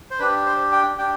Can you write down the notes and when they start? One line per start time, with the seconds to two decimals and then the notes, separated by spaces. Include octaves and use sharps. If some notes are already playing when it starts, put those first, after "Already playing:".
0.11 C5
0.19 D4 G4 B4
0.46 C5
0.72 G5
0.98 D4 G4 G5